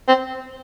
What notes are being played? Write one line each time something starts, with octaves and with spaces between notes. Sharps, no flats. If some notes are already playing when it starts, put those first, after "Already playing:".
C4